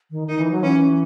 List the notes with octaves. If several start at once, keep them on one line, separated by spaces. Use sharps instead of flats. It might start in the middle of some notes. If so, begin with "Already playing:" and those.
D#3
D#3 D#4
E3
F#3
E3 C#4